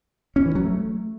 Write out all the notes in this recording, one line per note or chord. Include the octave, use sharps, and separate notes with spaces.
C#4
E3
F#3
A3